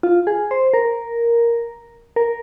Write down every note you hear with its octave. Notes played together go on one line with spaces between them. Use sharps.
F4
G#4
C5
A#4
A#4